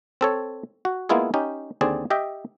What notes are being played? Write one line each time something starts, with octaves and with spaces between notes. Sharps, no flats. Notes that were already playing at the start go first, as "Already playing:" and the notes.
C4 A4 C#5
F#4
G#3 A#3 B3 E4 F4 G#4
C#4 D#4 G4
D#2 D3 C4 G#4 D5
G4 D#5 E5 G5